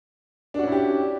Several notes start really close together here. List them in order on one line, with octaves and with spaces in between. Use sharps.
D4 F#4 C#4 E4 G4